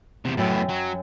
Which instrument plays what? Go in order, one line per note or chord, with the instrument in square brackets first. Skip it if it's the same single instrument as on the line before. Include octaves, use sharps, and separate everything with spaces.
[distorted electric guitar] E2 C3
[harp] F#2 G5 E6 [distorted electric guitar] A2 B3
[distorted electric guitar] F#3